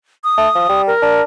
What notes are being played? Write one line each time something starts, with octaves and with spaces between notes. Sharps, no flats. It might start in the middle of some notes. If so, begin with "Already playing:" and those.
D#6
A3
F3
G3
A#4
D4